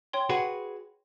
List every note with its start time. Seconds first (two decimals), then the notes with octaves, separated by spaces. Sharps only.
0.13 C#5 G5 C6
0.29 F#4 G#4 B4